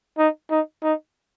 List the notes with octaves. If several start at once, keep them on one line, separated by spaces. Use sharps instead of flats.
D#4
D#4
D#4